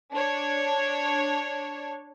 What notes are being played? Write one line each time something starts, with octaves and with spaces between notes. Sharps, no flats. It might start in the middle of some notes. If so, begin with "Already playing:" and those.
D4 C#5